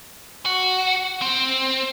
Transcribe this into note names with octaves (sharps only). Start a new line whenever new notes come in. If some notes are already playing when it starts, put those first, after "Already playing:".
F#4
C4